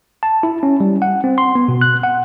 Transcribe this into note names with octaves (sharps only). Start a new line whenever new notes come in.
A5
E4
C#4
G3
F#5
C4
C6
B3
B2
F#6
F#5